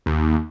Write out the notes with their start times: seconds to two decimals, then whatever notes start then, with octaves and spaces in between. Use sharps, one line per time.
0.06 D#2